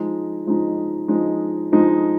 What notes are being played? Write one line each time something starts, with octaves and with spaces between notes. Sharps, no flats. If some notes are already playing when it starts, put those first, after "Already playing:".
Already playing: F3 G#3 D#4
F3 G#3 D#4
F3 G#3 D#4
F3 G#3 D#4